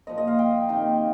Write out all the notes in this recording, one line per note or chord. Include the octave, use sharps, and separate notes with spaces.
A#2 F3 A#3 D#5
D#5
F5
G5
C3 D#3 A#3